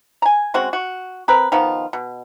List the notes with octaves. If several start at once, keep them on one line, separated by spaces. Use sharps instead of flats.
G#5 A#5
G#3 C4 C#4 F#4
F#4
C4 A#4 B4
D#3 F3 B3 F4
B2